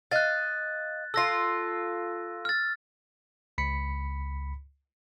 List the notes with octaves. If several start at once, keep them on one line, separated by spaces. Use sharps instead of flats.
D#5 F5 F#6 A6
F4 A4 E6 A#6
F6 A6
C#2 B5 B6 C#7